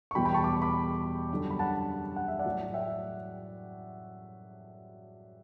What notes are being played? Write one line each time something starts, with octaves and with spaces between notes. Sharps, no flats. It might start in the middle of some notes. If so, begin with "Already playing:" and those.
C#6
E2 B2 G3 G5 B5
G5 B5
A5 C#6
D6
B5 D6
F#2 D3 G3
B5
F#5 A5
F#5
E5
D5 F#5
A2 F#3
E5 G5